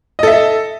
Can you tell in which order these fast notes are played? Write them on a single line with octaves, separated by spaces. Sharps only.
D#5 A4 E5